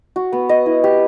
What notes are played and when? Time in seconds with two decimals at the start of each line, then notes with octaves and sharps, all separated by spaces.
0.16 F#4
0.33 B3
0.49 D#5
0.66 E4
0.84 G4